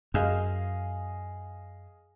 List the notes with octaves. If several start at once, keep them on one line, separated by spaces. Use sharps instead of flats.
F#2 G#4 D#5 F5